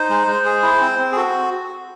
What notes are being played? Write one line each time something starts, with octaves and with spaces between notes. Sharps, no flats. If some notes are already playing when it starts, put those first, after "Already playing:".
Already playing: D#4 C5
G#3
G#3
G#4
E4
C4
C4
G#4
F#4 A4